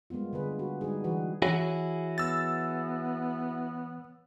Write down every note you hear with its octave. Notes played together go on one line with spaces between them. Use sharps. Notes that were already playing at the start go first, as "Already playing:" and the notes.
G3 G#3 A#3 B3 F4
D3 G#4 B4
F#4
G3 G#3 D#4 G#4
E3 F#4 B4
E3 E4 F#4 G#4 C#5
B3 E6 A6